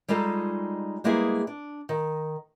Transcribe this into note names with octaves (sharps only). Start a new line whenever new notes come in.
G3 G#3 D#4 F4 A4
G3 G#3 A#3 B3 E4 G#4
D4
D#3